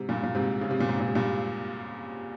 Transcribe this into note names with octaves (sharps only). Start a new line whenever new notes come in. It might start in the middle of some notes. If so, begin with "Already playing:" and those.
Already playing: G#2 C3
G2 A#2
A#2
G#2 C3
C#3
C3
A#2
G#2 C3
A#2
C3
G2 A#2